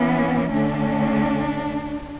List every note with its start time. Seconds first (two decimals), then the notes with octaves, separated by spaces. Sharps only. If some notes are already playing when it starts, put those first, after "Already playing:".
Already playing: E3 B3 C#4 E4
0.51 D3 A3 C#4 D4